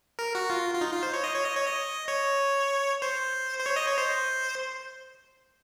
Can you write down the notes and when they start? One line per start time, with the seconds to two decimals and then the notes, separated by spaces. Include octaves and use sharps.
0.19 A#4
0.35 F#4
0.50 F4
0.75 F4
0.81 D#4
0.92 F4
1.03 C5
1.13 C#5
1.24 D#5
1.35 C#5
1.45 D#5
1.56 C#5
1.67 D#5
2.08 C#5
3.02 C5
3.59 C5
3.66 C#5
3.76 D#5
3.87 C#5
3.98 C5